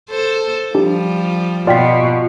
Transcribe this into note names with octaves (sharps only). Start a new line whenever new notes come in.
A4 C5
F3 G3 D4 G4
B2 F4 D5 G5 B6